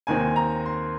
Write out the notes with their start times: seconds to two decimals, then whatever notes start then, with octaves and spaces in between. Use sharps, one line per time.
0.07 D#2 D#3 C4 D#4 G#5
0.36 A#5
0.66 C6